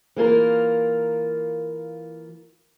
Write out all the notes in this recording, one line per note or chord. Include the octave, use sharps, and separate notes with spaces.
E3 A#3 F4 A#4